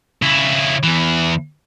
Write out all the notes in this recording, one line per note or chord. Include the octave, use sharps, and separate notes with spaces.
C#3 E4
E2 E3